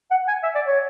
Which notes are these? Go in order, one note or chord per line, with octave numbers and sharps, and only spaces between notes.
F#5
G#5
E5
D5
C#5